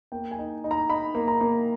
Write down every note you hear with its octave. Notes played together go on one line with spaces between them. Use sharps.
A#3 G5
G#5
D#4
D#4
A#5
D#4 B5
A#3
A#5
A#3